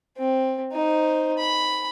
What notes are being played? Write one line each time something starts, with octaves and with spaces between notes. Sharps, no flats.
C4
D#4 C5
B5